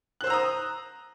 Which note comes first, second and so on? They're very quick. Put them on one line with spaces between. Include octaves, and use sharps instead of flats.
F#6 C5 E6 A#5 D#6